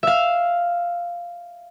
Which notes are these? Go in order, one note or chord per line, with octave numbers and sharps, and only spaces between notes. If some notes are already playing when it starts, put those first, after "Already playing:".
E5 F5